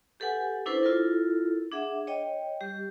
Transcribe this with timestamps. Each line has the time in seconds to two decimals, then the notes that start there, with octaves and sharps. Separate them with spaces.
0.20 G4 A4 B4 F#5 G#5
0.66 C#4 D4 E4 A4 B4 C5
0.83 E4 F4 A4 A#4
1.72 D4 G#4 E5 F#5
2.07 C#5 D#5 G5
2.61 G3 G4